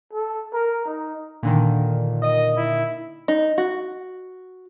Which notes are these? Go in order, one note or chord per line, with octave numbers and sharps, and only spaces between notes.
A4
A#4
D#4
A#2 D3 D#3
D#5
E4
D#4
F#4